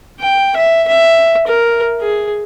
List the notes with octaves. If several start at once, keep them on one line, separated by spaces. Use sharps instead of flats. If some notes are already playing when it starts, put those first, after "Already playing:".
G5
E5
E5
A#4
G#4